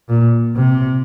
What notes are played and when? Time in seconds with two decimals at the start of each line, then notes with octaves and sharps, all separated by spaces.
0.09 A#2
0.56 C3